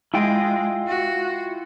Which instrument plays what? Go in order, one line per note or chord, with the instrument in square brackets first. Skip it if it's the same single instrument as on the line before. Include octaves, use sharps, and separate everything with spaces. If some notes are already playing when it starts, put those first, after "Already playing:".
[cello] G#3 [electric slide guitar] E4 F4 G5
[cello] F#4